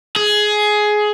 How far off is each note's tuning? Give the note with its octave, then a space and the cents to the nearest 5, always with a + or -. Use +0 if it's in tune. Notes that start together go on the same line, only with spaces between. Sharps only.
G#4 +15